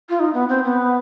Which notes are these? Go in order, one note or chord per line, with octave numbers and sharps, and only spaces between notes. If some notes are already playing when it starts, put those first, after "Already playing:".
F4
D#4
B3
C4
B3